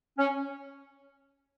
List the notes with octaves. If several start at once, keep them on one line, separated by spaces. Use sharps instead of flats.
C#4